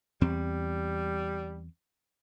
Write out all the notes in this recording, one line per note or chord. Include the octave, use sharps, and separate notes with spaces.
E2 G3 C4